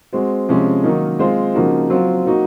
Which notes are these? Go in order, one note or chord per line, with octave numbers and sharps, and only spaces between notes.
G#3 C4 F#4
C3 F3 G#3 C#4
D#3 F#3 A#3 D#4 A#4
G#3 C4 F4 C5
C#3 F3 A#3 D#4 F#4
F#3 C4 F4
F#3 A#3 D#4 F#4